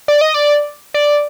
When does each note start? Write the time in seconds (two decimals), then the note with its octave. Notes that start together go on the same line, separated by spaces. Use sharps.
0.08 D5
0.21 D#5
0.34 D5
0.94 D5